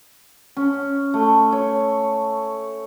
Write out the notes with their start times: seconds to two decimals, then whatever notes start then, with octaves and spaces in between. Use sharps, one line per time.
0.57 C#4
1.14 A3
1.52 C#5